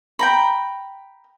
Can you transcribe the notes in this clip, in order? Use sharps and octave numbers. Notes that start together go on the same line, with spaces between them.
G5 A#5 B5